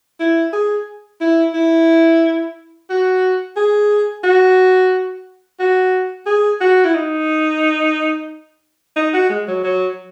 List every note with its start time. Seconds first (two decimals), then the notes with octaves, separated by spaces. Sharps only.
0.20 E4
0.53 G#4
1.21 E4
1.54 E4
2.90 F#4
3.56 G#4
4.24 F#4
5.60 F#4
6.26 G#4
6.61 F#4
6.85 E4
6.95 D#4
8.96 D#4
9.14 F#4
9.30 G#3
9.47 F#3
9.64 F#3